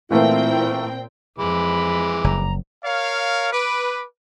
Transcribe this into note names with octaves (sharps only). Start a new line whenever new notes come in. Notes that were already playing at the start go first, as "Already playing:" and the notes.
A#2 E3 A3 A#3 C4 E4 G5
F2 E3 G#3 B5 D6
F#1 A#5
A#4 C#5 F5
B4 D6